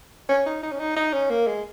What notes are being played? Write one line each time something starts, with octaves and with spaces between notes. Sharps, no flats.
C#4
D#4
D#4
C#4
D#4
D#4
C#4
A#3
G#3